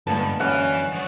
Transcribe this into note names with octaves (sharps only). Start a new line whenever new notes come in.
G2 D3 G#3 A#3 B3 A5
F#2 E4 B4 F5 F#5
F3 C#5